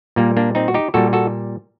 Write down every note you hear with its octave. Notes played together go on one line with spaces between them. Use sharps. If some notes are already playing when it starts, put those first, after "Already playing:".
A#2 G3 A#3
A#3 D4
C4 D#4
F#4
D#4 G4
A#2 G3 F#4 A4
F#4 A4